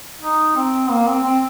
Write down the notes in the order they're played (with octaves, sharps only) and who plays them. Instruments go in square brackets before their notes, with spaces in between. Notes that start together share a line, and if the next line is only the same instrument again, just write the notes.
[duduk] D#4
C4
A#3
C4
C4